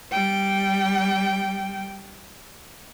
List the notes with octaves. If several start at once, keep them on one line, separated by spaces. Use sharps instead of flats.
G3 G5